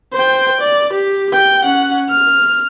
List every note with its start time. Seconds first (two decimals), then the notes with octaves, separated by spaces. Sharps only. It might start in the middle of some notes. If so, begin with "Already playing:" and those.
0.13 C5 G5
0.61 D5
0.93 G4
1.33 G5
1.63 C#4 F#5
2.09 F6